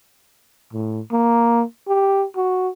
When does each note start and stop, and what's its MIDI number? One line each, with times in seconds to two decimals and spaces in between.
0.73 1.00 45
1.12 1.63 58
1.88 2.25 67
2.36 2.69 66